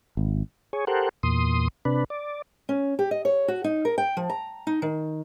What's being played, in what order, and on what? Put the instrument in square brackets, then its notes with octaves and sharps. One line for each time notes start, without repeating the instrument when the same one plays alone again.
[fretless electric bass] G#1
[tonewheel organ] G#4 C#5
G4 A4 A#4 C5 F#5
E2 A#2 C6 D#6
C3 D4 B4
D5
[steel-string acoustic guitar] C#4
G4
D#5
C#5
F#4
D#4
A#4
G5
F3
A#5
D#4
D#3